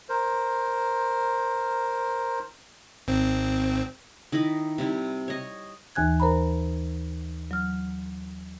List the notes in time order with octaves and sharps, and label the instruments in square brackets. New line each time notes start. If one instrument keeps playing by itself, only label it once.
[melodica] A#4 C5
[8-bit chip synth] G#1 C4
[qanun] D#3 E4 D#5 B5
C3 G3 E4
C#5 D#5
[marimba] D#2 E3 G#5 F#6 G#6
A#4 C5 A#5 B5
F#3 F6